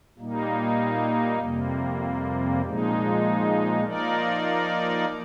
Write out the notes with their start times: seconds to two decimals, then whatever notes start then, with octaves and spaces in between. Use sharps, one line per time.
0.18 A#2 G3 A#3 D#4
1.39 F2 C3 G3 A#3
2.62 A#2 F3 G#3 D#4
3.84 F3 A#3 D#4 A#4 D5